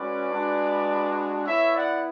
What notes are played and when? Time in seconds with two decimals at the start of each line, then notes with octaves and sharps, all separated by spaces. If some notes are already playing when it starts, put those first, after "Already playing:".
Already playing: G#3 C#4 F#4 B4 D5
0.30 G#3 D4 F#4
1.45 B3 E4 C#5 E5
1.74 D5 F#5